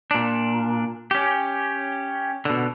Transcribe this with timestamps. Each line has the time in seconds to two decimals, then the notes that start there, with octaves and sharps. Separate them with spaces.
0.11 A#2 D4
1.11 C#4 G4
2.45 B2 D3